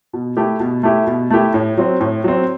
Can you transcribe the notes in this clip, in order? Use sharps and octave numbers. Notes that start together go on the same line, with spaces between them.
B2
A3 E4 G4
B2
A3 E4 G4
B2
A3 E4 G4
A2
F#3 C4
A2
F#3 C4